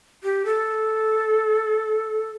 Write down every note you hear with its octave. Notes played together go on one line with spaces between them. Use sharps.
G4
A4